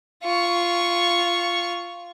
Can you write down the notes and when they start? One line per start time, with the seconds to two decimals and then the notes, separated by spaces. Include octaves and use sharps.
0.25 F4 C#6